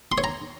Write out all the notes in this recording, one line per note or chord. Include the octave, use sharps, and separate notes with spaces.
C6
C#5
A#5